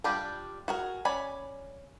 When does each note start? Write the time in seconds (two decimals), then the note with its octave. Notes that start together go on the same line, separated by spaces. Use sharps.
0.04 G3 D4 F4 G4 D5
0.68 F#4 G#4 A#4
1.05 C#4 D5 G#5 B5